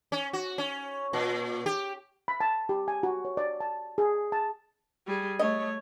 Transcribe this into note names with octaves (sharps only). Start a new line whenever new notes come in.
C#4
F#4
C#4
A#2
G4
B5
A5
G4
G#5
F#4
C#5
D5
A5
G#4
A5
G3 G#4
A3 C#5 D#5